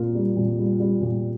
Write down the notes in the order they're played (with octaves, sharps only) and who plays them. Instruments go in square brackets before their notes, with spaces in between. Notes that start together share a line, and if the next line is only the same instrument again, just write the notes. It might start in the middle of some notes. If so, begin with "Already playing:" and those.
Already playing: [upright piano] A#2 A#3 F4
G3
A#2
G3
G3
A#2